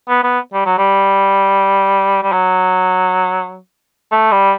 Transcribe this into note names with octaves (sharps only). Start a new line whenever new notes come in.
B3
B3
G3
F#3
G3
G3
F#3
A3
G3